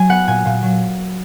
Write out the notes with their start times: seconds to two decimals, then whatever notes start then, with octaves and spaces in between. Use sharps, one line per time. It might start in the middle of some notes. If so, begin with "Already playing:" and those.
Already playing: F#3 G#5
0.09 B3 F#5
0.27 A#2 G#5
0.45 A#2
0.62 F#3